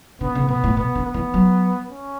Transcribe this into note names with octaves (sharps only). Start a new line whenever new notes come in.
D3 B3
C#3
B2 B3
A2
B2 B3
D3
B3
E3
F#3
C#4